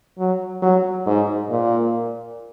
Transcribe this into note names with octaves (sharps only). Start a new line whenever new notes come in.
F#3
F#3
G#2
A#2